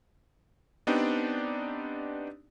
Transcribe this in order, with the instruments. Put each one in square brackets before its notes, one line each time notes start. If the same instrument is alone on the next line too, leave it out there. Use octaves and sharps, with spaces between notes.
[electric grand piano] B3 C4 D4 D#4 G4 D5